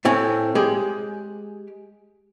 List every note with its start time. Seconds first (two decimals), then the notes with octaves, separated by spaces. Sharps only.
0.05 A2 A3 C4 G#5
0.55 G#3 G4 G#4